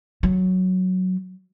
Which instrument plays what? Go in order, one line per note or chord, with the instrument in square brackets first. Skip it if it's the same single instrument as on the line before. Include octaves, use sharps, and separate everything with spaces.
[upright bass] F#3